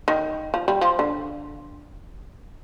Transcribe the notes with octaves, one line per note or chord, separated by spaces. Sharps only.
D#3
F3
G3
F3
D3